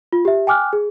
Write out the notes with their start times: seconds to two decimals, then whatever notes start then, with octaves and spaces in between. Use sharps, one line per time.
0.13 F4
0.25 G4 E5
0.47 G5 G#5 D6 F6 F#6
0.73 G#4